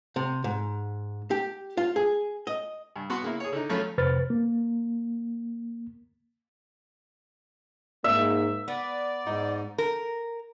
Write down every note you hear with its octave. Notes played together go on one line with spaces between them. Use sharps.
C3
G#2
G4
F4
G#4
D#5
G2
B3 F#4 C6
C#3 A#3 E4
G#4 C#5
D3 D#4
F3 F#3 A3 C#4 B5
F2 C3 B4 C5 F6 A6
A#3
G#2 A#3 E5
B3 D5
G#2 D#4
A#4